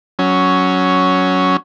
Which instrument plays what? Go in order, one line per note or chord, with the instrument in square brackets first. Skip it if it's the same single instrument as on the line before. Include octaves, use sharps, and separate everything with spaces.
[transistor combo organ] F#3 C#4